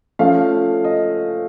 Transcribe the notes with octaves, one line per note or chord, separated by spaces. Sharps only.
F3 A3 C#4 F5
D#5